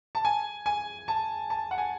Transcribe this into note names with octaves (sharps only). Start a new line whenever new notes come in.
A5
G#5
G#5
A5
A5
F#5
G#5